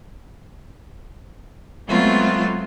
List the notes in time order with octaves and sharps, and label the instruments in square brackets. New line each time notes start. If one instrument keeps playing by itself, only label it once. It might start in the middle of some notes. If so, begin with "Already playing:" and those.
[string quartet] F#3 G#3 A3 B3 C4 F4